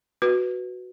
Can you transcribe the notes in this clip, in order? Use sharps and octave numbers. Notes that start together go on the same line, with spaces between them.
F#4 B4